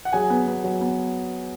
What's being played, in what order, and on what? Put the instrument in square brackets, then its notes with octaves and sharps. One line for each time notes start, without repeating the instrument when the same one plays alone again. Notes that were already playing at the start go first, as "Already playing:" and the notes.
[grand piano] F#5
F#3 G#4 G#5
B3
B3
F#3
B3